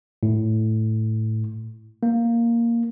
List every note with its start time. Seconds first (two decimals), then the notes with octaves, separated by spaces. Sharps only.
0.23 A2
2.03 A#3